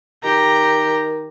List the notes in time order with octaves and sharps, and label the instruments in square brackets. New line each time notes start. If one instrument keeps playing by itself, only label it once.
[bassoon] D#3 [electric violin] G4 A#5